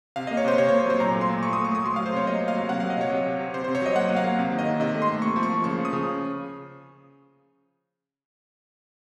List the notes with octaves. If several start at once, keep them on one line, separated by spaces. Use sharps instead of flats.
C3 F5
A#3 D#5
C#5
C3 C5
C3 C#5
C#5
A#3
C#5
F#3 C5
A#2 A#5
A3
C6
A#2
A3 C#6
A3 D#6
C#6
A3 D#6
F#3 C6
F#3 F5
C5
C3 C#5
A#3 D#5
A#3
F5
F#3
C3 F#5
F#3 F5
D#5
C3 C#5
C3
C3
C3
C3 C5
C3 C5
C#5
F#3 D#5
A#3 F#5
A#3
F5
A#3
C3
D#3
D#5
D#3
C3 D#5
A3
C6
A3
A#3 C#6
F3
C#6
F3
C#3 C#6
F3
D#6
C#3